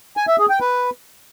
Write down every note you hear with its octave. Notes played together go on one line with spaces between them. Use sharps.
G#5
E5
G#4
G5
B4